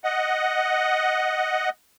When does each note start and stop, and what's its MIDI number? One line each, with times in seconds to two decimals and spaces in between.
0.04 1.69 75
0.04 1.69 78